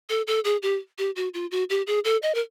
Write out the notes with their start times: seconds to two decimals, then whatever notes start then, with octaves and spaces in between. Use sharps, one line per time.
0.09 A4
0.27 A4
0.45 G#4
0.63 G4
0.98 G4
1.16 F#4
1.34 F4
1.51 F#4
1.70 G4
1.87 G#4
2.04 A4
2.23 D#5
2.35 A#4